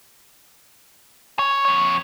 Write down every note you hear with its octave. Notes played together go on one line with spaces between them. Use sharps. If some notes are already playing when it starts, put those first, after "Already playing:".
C#5
F2 C#5